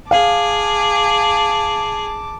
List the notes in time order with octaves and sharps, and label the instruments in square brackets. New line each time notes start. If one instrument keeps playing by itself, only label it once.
[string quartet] G#4 [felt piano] F5 [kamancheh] A5 D6